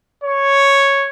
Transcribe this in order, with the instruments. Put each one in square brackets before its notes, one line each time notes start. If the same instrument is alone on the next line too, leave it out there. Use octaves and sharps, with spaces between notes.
[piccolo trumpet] C#5